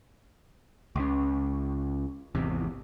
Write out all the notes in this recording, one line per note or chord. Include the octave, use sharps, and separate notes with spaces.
C#2 C#3
G#1 E2 C3